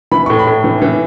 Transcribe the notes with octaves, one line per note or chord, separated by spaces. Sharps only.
E3 B5
A2 C#6
B5
A2
E3
E3